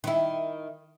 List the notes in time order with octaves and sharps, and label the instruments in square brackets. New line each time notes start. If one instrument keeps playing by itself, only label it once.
[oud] D#3 E4